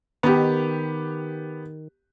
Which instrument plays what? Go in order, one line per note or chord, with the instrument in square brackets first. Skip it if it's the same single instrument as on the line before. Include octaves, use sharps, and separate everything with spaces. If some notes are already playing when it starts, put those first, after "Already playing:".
[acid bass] D#3 [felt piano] B3 G4